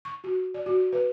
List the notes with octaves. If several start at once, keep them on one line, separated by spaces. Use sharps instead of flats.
C#6
F#4
D5
F#4
B4